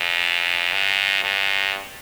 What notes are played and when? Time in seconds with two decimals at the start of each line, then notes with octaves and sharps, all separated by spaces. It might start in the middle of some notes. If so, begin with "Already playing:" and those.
Already playing: F2
0.73 G2
1.24 G2